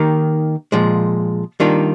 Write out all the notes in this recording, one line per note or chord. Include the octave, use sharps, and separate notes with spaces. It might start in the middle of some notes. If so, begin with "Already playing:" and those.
Already playing: D#3 A#3 D#4 G4
A#2 F3 G#3
D#3 G3 A#3 D4 F4